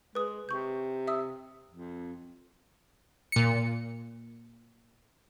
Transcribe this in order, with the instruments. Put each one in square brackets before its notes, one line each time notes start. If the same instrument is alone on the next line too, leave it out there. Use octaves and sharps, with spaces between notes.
[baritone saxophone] G#3 [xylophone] B4 D#6
[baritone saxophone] C3 [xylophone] C#6 G6
[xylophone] E5 D#6 E6
[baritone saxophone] F2
[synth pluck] A#2 C#7